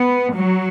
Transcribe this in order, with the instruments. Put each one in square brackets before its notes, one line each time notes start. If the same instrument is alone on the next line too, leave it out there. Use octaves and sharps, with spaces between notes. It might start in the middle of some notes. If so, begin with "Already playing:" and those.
Already playing: [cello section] B3
F#3